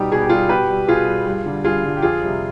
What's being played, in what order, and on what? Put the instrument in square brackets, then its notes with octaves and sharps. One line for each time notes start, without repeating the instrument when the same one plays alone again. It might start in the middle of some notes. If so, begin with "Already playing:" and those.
Already playing: [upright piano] B2 G3 D#4 G4
B2 G#4
G4
G3 F4 G#4
B2 G4 B4
G3
B2 F4 G#4
G3
G2
D3 G3
G2 F4 G#4
D3 G3
G4
F2 F4 G#4
C3 G3